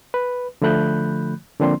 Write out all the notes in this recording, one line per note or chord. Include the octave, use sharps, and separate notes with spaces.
B4
D3 F3 A3 B5 F#6 G6
D3 F3 A#3 C4 D4 C6